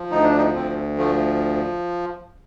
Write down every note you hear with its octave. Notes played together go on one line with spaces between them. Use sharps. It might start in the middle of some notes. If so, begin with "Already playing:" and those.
Already playing: F3
D2 D#4
D4
D#4
D2 C4
F3 A3